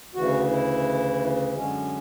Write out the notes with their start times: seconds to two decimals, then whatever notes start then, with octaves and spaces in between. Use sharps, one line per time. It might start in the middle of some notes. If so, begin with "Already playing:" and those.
0.15 D2 C#3 E3 F#4
0.50 E4
1.55 F#2 D3 G#3 C#4